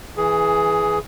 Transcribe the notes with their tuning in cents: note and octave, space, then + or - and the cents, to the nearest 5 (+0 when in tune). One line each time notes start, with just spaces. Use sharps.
E3 +0 G#4 +10